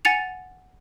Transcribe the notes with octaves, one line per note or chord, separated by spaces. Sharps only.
F#5 G#5 A6 C#7 F7